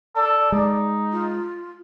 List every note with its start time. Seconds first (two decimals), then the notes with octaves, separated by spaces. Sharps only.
0.16 A4 D5
0.52 G#3 D#4
1.12 F4